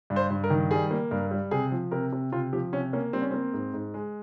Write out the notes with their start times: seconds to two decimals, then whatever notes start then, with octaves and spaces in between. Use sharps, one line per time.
0.10 G2
0.16 C5
0.30 G2
0.44 A#4
0.50 D#3
0.71 G3 G#4
0.91 A#3
1.11 G2 A#4
1.31 G3
1.51 C3 G#4
1.72 F3
1.91 C3 A#4
2.12 C3
2.32 C3 F4
2.53 F3 G4
2.73 C3 C#4
2.93 A#3 C#4
3.13 G3 C4
3.22 C#4
3.31 A#3 C4
3.53 G#2
3.74 G#2
3.94 G#3